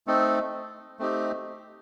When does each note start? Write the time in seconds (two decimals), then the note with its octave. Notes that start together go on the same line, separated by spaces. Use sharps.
0.07 A3 C4 D#4 A4
0.99 A3 C4 D#4 G4